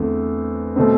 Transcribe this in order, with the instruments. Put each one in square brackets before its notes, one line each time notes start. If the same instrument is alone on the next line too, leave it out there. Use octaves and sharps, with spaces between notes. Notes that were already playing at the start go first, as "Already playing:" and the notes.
Already playing: [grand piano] E2 D3 A3 C4
B2 A3 C4